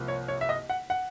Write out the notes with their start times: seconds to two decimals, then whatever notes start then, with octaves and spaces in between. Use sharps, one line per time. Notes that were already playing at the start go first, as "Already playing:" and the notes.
Already playing: C2 C3 F3 A#3
0.08 C#5
0.28 C#5
0.41 E5
0.49 D#5
0.70 F#5
0.90 F#5